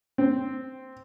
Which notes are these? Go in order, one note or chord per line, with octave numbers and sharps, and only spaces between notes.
C4